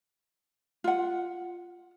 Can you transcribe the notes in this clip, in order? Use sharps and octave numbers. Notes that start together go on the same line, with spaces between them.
F4 F#5